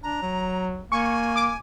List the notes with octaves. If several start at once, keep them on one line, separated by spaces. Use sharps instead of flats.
D4 A#5
F#3
A#3 G#5 C#6
D6